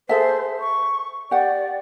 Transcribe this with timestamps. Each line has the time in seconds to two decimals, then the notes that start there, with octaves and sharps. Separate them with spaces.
0.09 G#4 A4 C5 E5
0.60 C#6
1.31 G4 D5 F#5